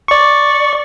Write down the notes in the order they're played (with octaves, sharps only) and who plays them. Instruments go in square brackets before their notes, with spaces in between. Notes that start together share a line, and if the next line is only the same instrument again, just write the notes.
[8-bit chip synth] D5 C#6